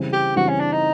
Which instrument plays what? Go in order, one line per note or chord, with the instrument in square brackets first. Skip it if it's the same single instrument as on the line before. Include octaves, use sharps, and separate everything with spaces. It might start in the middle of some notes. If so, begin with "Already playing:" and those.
Already playing: [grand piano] C#3 E3 G3 C4
[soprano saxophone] G4
[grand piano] C#3 E3 G3 C4 [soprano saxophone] F#4
[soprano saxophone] C#4
D4
D#4